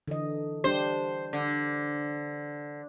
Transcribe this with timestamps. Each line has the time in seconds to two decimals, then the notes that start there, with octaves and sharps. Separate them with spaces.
0.08 D3 E3 D#5
0.64 G3 D4 G4 C5
1.33 D3